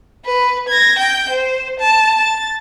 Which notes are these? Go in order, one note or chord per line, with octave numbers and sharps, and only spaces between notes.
B4
G#6 A#6
G5 G6
C5
A5
A6